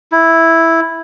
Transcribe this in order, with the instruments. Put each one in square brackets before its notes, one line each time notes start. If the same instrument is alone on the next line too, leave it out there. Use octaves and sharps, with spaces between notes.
[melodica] E4